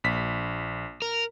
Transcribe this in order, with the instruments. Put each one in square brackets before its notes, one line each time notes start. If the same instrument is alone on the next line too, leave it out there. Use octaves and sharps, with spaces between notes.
[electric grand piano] A#1 B6
[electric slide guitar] A#4